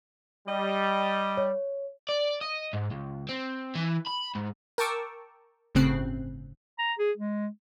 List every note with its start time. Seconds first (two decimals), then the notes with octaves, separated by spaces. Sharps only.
0.48 G3 D#5
1.37 C#5
2.09 D5
2.41 D#5
2.73 G#2
2.91 C#2
3.29 C4
3.75 E3
4.06 B5
4.35 G#2
4.78 A#4 G5 A5 C#6 D6 E6
5.75 G1 A2 C#3 C4 F#6 C7
6.79 A#5
6.99 G#4
7.17 G#3